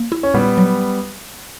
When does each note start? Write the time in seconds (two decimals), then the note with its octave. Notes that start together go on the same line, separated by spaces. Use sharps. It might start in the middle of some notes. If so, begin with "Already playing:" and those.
Already playing: A#3
0.12 E4
0.23 C#4
0.34 A#2 G3 B3
0.58 F#3